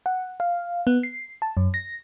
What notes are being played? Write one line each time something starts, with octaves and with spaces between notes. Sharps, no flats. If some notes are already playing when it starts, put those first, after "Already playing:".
F#5
F5
B3
C7
A5
F#2
A#6